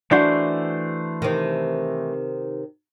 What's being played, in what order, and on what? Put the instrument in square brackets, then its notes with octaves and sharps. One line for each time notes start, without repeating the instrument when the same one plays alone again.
[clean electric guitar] E3 A3 C5 [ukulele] D4 F#4 F#5
[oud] C3 D#3